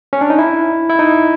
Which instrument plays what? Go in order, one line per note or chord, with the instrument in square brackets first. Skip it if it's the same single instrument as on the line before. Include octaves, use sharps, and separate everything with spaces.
[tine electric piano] C#4
D4
D#4
E4
E4
D#4